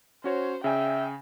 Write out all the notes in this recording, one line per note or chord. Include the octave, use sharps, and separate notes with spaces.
C#4 F#4 C5 C#5
C#3 E5 G5 G#5